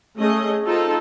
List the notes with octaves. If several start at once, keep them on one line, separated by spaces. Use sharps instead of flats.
A3 C#4 G#4 D#5
C4 D#4 F4 A4